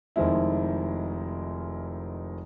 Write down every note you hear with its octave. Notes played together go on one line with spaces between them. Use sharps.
F1 D#3 F3 G#3 E4